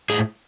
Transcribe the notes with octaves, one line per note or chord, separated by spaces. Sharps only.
A2 G#4